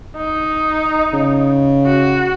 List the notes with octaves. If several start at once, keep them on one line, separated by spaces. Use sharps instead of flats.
D#4
C#3
F#4